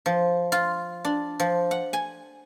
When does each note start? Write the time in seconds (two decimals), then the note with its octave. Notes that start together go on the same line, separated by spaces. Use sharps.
0.06 F3
0.52 F4
1.05 D4
1.40 F3
1.71 F#5
1.93 G#5